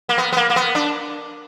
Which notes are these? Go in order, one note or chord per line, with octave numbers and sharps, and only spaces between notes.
A#3
B3
B3
A#3
A#3
B3
D4